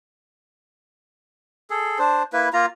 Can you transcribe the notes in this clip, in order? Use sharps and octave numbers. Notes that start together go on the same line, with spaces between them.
G#4 A4
D4 C5
A#3 E4 B4
A#3 F4 A#5